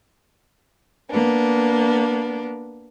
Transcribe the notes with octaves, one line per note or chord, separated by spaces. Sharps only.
A#3 B3 D4